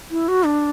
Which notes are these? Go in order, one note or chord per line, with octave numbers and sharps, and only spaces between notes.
E4
F#4
D4